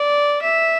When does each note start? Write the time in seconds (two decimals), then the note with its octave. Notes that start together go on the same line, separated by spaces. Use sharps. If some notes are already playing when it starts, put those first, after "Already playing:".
Already playing: D5
0.42 E5